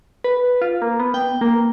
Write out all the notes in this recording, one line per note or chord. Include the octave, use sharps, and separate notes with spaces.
B4
F4
A#3
B3
G5
A#3